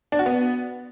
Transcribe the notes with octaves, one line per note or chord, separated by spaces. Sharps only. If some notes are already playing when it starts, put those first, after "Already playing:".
D4
F#4
B3